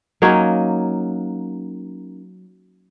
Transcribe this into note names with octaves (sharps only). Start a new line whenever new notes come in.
F#3 A#3 C#4 D#4